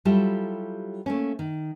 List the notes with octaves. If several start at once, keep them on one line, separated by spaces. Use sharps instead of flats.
F#3 G3 E4 F4 G4 A4
A3 A#3 C#4
D#3